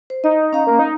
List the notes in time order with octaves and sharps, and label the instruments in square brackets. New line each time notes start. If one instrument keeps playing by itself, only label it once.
[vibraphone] C5
[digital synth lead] D#4 [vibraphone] D#5
[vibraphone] C#4 F5 A#5
[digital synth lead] A#3
D#4